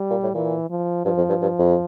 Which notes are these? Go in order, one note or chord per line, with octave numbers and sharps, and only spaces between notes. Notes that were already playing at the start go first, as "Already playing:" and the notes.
Already playing: G3
A#2
A2
A#2 E3
F3
G2 F3
F2
G2
G2
F2